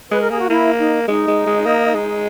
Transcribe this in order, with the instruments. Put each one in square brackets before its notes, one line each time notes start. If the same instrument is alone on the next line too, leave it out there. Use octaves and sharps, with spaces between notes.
[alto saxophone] G#3 [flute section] B4
[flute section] A#4
[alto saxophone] A#3 [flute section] G#4
[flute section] F#4
[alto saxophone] A#3 [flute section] E4
[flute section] D#4
[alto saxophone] G#3 [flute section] D#4
[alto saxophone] G#3
G#3
A#3
G#3